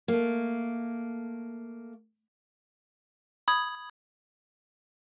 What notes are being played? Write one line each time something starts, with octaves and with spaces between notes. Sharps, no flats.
A3 A#3
B5 D#6 G#6